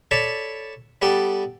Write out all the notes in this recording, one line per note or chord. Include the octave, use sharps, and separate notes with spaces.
A4 C#5 D5 A5 B5
G3 B3 A4 D5 G5